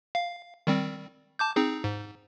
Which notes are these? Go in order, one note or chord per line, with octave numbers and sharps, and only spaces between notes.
F5
D#3 G3 C4
A5 D6 G6
C4 D#4 G#4
G#2